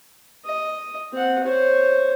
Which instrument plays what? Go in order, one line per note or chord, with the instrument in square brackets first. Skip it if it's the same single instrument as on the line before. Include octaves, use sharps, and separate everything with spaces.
[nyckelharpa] D#5
C4 F#5
C5 C#5